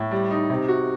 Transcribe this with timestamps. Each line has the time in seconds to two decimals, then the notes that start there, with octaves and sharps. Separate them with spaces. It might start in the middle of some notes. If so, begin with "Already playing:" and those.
Already playing: A2
0.11 G3
0.31 D#4
0.50 C3
0.68 F#4